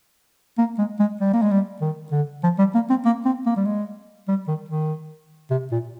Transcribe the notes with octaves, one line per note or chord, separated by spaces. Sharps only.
A#3
G#3
G#3
G3
A#3
G#3
G3
D#3
D3
F3
G3
A#3
C4
A#3
C4
A#3
G3
G#3
G3
D#3
D#3
C3
A#2